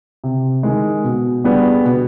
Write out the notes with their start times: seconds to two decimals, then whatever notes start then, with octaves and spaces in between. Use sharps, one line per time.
0.24 C3
0.63 D#3 G#3
1.04 B2
1.44 G3 B3 D4 G#4
1.85 B2